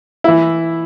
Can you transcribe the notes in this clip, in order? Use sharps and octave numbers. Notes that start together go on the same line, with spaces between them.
E3 E4